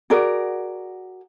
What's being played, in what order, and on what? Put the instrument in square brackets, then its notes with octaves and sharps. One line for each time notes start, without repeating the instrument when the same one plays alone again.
[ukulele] F#4 G#4 A#4 D5